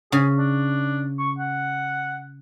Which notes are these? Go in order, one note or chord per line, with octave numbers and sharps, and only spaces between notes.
C#3 G#4
D4
C#6
F#5